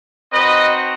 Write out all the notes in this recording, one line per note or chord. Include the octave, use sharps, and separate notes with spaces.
C4 D#4 F#4 B4 D#5